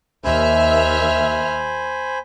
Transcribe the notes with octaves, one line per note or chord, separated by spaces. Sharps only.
D#2 C5 E5 G#5 B5 F6